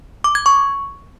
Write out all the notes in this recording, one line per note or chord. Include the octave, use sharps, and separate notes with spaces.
D6
G#6
C#6